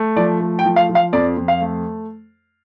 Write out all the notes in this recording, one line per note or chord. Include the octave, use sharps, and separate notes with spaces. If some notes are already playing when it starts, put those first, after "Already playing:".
Already playing: A3
F3 D5
A3
G5
F3
F5
F3
F5
F2 D5
F2
F5
A3